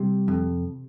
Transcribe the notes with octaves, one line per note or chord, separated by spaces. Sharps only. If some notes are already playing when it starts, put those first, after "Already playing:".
Already playing: C3 G3
F2